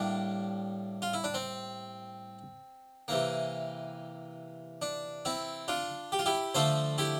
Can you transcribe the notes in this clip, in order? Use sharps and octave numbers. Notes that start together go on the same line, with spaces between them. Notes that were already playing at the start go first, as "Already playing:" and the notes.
Already playing: A2 G3 A#3 D4
F4
E4
D4
C4
C3 E3 A#3
D4
C4 E4
D4 F4
G4
F4
E4 G4
D3 F3 A3 A4 C5
E4 G4